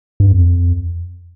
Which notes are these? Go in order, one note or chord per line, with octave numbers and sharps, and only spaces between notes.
G2
F2